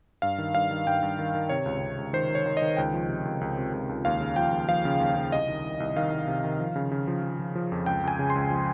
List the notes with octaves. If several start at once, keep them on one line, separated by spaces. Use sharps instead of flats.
G2 F5
D#3
G2 F5
D#3
G2 G5
G2
D#3
D#3
C3 C#5
C#2
C3
C#2
D#3 C5
D#3
C#5
D#3
D#5
D#3
C#2 G5
F3
C3
C#2
C#2
C3
C#2
C#2
D#2 F5
C#3
F3 G5
D#2
F3 F5
C#3
D#2
C#3
C2 D#5
D#3
C2
C2
D#3 F5
C2
C3
D#3
F3
C#3
C#3
F3
F3
F3
F3
F2
C#2 G5
C#2 G#5
C#3
C6
C#2
F3